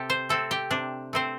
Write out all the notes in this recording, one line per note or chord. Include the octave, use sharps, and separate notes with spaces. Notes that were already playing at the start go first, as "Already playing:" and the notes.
Already playing: C3 G4 A4
C5
A3 C4 A4
G4
C3 D4
A3 C4 C5